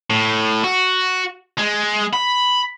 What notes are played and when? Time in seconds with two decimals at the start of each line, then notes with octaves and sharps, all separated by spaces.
0.10 A2
0.64 F#4
1.58 G#3
2.14 B5